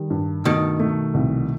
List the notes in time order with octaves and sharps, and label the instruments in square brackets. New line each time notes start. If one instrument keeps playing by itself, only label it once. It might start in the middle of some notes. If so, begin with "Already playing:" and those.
Already playing: [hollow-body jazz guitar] D#3 [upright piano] G3
[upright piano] G2
[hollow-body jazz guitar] B2 D#3 [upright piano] A3
[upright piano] A3
C2